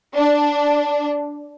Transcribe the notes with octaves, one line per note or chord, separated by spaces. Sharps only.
D4